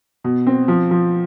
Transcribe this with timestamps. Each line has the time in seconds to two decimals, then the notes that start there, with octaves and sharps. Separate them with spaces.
0.24 B2
0.47 C4
0.68 F3
0.91 F3